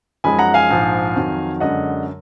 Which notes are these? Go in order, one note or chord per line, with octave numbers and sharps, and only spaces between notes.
F#2 F3 G#3 D#4 G#5 B5
F#5 A#5
F5 G#5
A#1 G#2 F3
F2 D#3 F#3
F#2 D3 G#3 D4 D#5 F#5